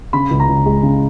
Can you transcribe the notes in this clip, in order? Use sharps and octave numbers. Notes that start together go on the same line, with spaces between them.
C#3 B5
C#2
A#5
C#2
G#3
C#3